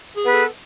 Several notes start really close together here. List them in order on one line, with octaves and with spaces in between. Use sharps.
G#4 B3 B4 A4